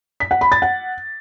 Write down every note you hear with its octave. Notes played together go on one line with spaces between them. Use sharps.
B6
F#5
B5
A6
F#5